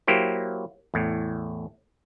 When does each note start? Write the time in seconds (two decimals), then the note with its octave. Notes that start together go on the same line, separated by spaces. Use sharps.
0.07 F#3 A#3 E4 G4 C5
0.94 E2 A2